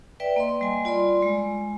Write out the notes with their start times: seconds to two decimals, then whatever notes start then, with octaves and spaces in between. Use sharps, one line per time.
0.20 B4 D5 E5 G5
0.36 A#3 D#5 C6
0.61 G3 G#5
0.85 F4 D5 B5 C6
1.22 G#3